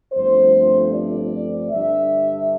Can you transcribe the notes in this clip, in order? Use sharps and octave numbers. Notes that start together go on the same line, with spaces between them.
G1 G2 F3 A3 C4 C5
D5
G2 D3 G3 D4 E5